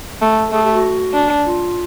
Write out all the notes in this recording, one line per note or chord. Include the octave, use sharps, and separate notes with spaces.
A3
A4
A3 G#4
G4
F#4
D4
F4